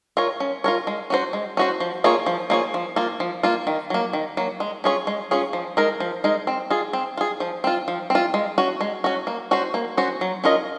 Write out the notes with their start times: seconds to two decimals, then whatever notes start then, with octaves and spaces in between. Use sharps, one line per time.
0.17 F4 A#4 C#5
0.40 C#4
0.64 F4 A#4 C#5
0.87 G#3
1.10 C#4 F#4 C5
1.33 G#3
1.57 C#4 F#4 C5
1.80 F3
2.04 A#3 F4 G#4 C#5
2.26 F3
2.50 A#3 F4 G#4 C#5
2.74 F3
2.96 A#3 F4
3.20 F3
3.43 A#3 F4
3.67 D#3
3.90 F#3 A#3
4.13 D#3
4.37 F#3 A#3
4.60 G#3
4.84 C#4 F4 G#4 C#5
5.07 G#3
5.31 C#4 F4 G#4 C#5
5.53 F3
5.77 G#3 D#4 A#4
6.00 F3
6.24 G#3 D#4 A#4
6.47 C4
6.70 F4 G#4
6.93 C4
7.17 F4 G#4
7.40 F3
7.64 C4 F4
7.88 F3
8.10 C4 F4
8.34 G#3
8.58 C#4 F#4
8.81 G#3
9.04 C#4 F#4
9.27 A#3
9.51 C#4 F#4 C5
9.74 A#3
9.97 C#4 F#4 C5
10.21 F#3
10.44 C#4 F4 A#4 D#5